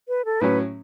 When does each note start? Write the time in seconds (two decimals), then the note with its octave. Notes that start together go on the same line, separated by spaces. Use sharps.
0.08 B4
0.25 A4
0.41 A2 F#3 C#4 B4